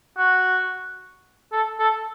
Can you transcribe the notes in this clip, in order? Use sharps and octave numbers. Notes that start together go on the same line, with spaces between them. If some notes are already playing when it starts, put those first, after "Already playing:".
F#4
A4
A4